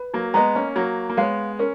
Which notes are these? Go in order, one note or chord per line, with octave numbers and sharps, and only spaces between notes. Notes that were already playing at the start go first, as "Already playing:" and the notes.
Already playing: B4
F#3 A#3
G#3 B3 D#5 A#5
A#3 C#4
F#3 A#3 F#4
A#3
G#3 B3 C#5 F5
C#4 A#4